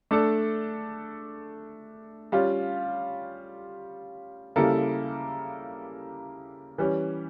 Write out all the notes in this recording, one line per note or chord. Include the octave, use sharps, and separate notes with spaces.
A3 D4 A4
G3 C#4 F4
C#3 G3 A#3 E4 A4
E3 G3 C#4